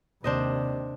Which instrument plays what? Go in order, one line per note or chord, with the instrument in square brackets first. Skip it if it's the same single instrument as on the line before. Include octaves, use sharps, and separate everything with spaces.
[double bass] D#2 [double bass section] C3 [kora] D4 C5 D#5